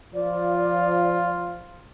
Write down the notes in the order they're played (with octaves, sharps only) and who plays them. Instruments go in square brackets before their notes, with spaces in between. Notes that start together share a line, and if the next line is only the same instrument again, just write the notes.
[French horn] F3 [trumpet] F4 [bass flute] D5